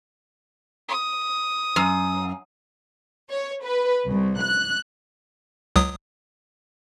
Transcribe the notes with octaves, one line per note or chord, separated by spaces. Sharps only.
D#6
F#2
C#5
B4
C2
F#6
C#2 F#3 D#6